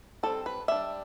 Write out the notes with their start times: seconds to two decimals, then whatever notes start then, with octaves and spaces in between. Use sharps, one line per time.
0.23 G3 C4 A4
0.46 B4
0.68 G3 D4 E5